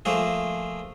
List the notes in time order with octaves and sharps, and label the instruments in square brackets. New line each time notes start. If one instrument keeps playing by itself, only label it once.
[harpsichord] F3 A3 A#3 G#4